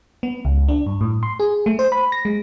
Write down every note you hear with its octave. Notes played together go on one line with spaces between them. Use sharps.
B3
C#2
D4
G2
A2
C6
G#4
A3
C5
B5
A#6
G#3